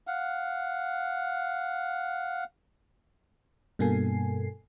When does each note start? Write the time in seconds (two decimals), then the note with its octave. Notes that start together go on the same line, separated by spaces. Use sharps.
0.07 F5 F#5
3.79 G2 B2 A#3 A4 G#5 C7